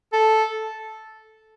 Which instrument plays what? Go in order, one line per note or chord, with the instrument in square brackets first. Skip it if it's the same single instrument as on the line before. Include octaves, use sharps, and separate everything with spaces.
[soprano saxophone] A4